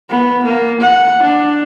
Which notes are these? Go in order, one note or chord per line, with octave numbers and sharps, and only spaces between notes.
B3
A#3
F#5
D4